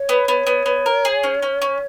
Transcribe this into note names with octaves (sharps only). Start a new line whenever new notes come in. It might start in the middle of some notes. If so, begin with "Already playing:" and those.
Already playing: C#5
B3
B3
B3
B3
A#4
G#4
C#4
C#4
C#4